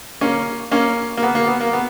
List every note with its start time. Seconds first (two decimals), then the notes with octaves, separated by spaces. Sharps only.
0.21 A#3 C#4
0.71 A#3 C#4
1.17 A#3
1.23 B3
1.35 A#3
1.47 B3
1.61 A#3
1.73 B3